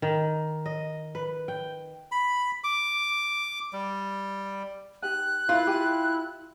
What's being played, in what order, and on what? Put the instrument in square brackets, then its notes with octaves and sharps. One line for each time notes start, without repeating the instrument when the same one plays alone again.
[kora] D#3
D#5
B4
G5
[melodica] B5
D6
G3
[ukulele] D#4 G4 G#5 [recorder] F#6
[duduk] E4 [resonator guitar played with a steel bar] F4 [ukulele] A#4 B4 E5
[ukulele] G4 G5 G#5